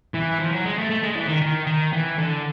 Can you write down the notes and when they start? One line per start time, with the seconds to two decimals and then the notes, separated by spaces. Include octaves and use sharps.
0.14 E3
0.40 F3
0.52 F#3
0.65 G#3
0.77 A3
0.90 A3
1.03 G#3
1.15 E3
1.28 D#3
1.42 D#3
1.67 D#3
1.93 E3
2.18 D3